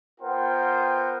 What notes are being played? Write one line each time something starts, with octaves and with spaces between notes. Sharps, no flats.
B3 F4 A#4 C5 F#5 G5